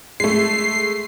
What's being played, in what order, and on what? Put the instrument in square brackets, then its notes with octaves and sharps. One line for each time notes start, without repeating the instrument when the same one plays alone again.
[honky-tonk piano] G#3 A3 [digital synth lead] C7